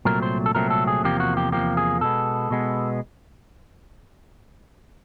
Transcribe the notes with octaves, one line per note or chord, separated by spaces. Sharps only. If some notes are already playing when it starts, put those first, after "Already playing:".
C2 A#2 F#3 A3 C4 A#4
C5
A4
C2 A#2 F#3 A3 C4 A#4
A4
G#4
E2 C3 F3 A#3 G4
F#4
G4
E2 C3 F3 A#3 G4
G#4
B2 G#3 B3 A4
B2 G#3 B3